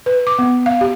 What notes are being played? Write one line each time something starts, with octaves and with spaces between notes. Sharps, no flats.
B4
D6
B3
F5
G4